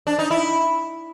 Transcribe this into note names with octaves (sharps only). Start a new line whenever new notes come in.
D4
D#4
E4